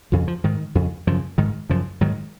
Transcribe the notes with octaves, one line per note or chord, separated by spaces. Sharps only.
F2 C#3 F3
F3
G#2 D#3
F2 C#3
F#2 C#3 F3
G#2 D#3
F#2 C#3 F3
G#2 D#3 F#3